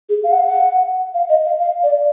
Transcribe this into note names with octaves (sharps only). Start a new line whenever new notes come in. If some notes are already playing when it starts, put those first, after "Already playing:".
G#4
F5
F#5
F5
F#5
F5
D#5
F5
F5
D5